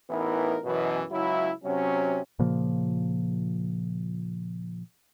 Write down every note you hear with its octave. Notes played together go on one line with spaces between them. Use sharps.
A1 E3 B3 D#4 E4 A#4
F#2 B2 E3
C#2 C#3 F#3 E4
C3 F#3 C#4
A#2 C#3 F3 A#3